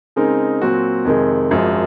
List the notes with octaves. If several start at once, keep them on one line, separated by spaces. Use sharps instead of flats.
C#3 G#3 C4 D#4 A#4
A#2 F#3 C4 F#4
F2 C3 D#3 G#3
G#1 F#2 F3 G#3